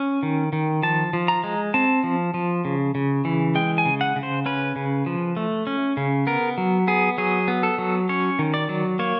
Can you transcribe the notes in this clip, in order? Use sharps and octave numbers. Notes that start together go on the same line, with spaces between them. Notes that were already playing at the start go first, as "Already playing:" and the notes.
Already playing: C#4
D#3
D#3
F3 A5
F3
A#5
G#3
C4 A5
F3
F3
C#3
C#3
E3
G#3 G5
G#5
C#3
F#5
C#3
C5
C#4 B4
C#3
F3
A3
C#4
C#3
B3 A#4
F#3
B3 G#4
F#3 G#4
B3
A4
F#3
C#4 C#5
D#3
D5
F#3
A#3 C#5